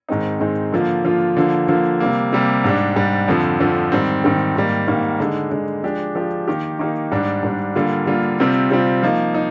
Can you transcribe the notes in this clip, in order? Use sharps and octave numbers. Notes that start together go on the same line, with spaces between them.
G#2 D#3 G#3 C4 D#4
G#2 D#3 G#3 C4 D#4
D3 F3 A#3 F4
D3 F3 A#3 F4
D3 F3 A#3
D3 F3 A#3
C3 G3 A#3
C3 G3 A#3
G#2 G3 D4
G#2 G3 D4
F2 D3 F3
F2 D3 F3
G#2 D#3 G3 C4
G#2 D#3 G3 C4
G#2 D#3 G3 A#3
G#2 D#3 G3 A#3
D3 G#3 D#4
D3 G#3 D#4
F3 G#3 D4 G4
F3 G#3 D4 G4
D#3 A#3 D#4 G4
D#3 A#3 D#4 G4
G#2 G3 D4
G#2 G3 D4
D3 G3 A#3 F4
D3 G3 A#3 F4
C3 G3 C4 F4
C3 G3 C4 F4
F3 A#3 D#4
D#4